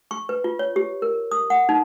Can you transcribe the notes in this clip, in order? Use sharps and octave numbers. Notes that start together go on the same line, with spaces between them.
C#6
B4
F4
C#5
G4
A#4
D#6
F#5
D#4